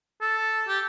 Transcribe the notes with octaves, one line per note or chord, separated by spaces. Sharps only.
A4
G4